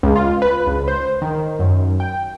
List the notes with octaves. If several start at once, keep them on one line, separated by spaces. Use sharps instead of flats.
C#2
F4
B4
C#2
C5
D#3
F#2
G5